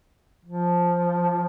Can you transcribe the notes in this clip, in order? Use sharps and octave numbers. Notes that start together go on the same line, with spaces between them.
F3